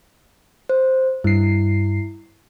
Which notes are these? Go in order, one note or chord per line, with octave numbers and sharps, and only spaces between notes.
C5
G2 E4 C7